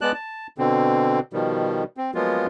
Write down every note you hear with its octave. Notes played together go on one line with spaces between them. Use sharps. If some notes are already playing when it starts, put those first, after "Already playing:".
G#3 B3 D5 A5 F#6
A5
B2 D3 C4
B2 D#3 F3 G3
C4
F3 F#3 G#3 A#3 B3 F4